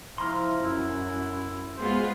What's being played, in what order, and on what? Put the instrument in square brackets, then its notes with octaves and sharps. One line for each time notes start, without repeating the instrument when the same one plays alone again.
[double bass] F3 E4 [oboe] A#5 [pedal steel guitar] C6 F6
[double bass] F#2 [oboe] E4
[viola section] G#3 B3 F4 [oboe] C5